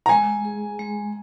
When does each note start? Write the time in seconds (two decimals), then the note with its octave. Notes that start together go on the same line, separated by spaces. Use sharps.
0.06 A#5
0.09 G#3 G#5
0.45 G#4
0.79 G#3